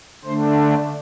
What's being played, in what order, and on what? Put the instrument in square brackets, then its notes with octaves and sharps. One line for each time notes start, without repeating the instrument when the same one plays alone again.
[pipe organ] D3 A3 D4 C5